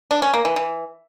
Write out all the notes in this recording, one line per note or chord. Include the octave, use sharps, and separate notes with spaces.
D4
C#4
A#3
E3
E3